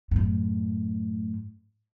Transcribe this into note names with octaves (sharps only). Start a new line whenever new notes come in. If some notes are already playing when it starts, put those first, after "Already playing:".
F#2 A2